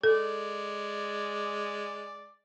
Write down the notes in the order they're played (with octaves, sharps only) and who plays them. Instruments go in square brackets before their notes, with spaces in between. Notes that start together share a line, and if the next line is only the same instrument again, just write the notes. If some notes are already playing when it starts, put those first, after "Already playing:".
[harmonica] G#3 D5 [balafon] A4